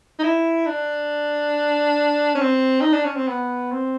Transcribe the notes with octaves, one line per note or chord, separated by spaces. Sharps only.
D#4
E4
D4
C#4
C4
D#4
D4
C#4
C4
B3
C4